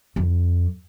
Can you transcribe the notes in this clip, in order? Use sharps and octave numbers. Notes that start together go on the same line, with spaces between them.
F2